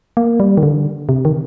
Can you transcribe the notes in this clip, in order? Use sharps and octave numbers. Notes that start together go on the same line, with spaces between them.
A#3
G3
D#3
D3
C3
D#3